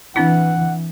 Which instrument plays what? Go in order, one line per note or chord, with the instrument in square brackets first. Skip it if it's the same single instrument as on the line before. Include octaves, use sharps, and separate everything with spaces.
[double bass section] E3 [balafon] C4 D4 E4 [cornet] F#5